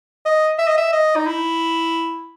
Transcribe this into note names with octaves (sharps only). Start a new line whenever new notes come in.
D#5
E5
D#5
E5
D#5
D#4
E4